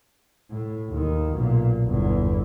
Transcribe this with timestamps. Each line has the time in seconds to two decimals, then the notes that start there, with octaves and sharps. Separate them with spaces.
0.50 A2
0.89 D#2 D#3
1.33 B1 A#2
1.84 G1 E2